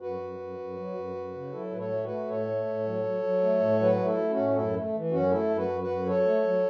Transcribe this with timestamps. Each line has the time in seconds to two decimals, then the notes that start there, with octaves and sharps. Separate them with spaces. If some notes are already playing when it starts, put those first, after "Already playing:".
0.01 F#2 F#4 B4
0.20 F#2
0.38 F#2
0.58 F#2
0.76 F#3
0.95 F#2
1.15 F#2
1.34 C#3
1.52 F#3 E4 A4
1.71 A2 B4
1.77 A4 C#5
1.90 A3
2.03 F#4 B4
2.08 A3
2.28 A2 A4 C#5
2.47 A3
2.65 A2
2.85 F#3
3.03 F#3
3.22 F#3
3.41 A3
3.60 A2
3.79 F#3 F#4 B4
3.99 A3
4.05 E4 A4
4.17 A3
4.30 C#4 F#4
4.37 A2
4.50 F#4
4.55 F#2 E4 A4
4.74 A3
4.93 E3
5.11 F#2 C#4 F#4
5.30 A3 E4 A4
5.49 F#2
5.56 F#4 B4
5.69 F#2
5.81 F#4 B4
5.88 F#2
6.06 F#3 A4 C#5
6.25 A3
6.44 F#3